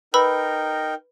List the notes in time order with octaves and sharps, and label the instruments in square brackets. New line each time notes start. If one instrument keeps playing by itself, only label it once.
[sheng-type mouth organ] D#4 A#4 G5 [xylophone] B4 B5 E6